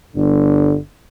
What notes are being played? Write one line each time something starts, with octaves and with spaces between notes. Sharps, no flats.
G1 D3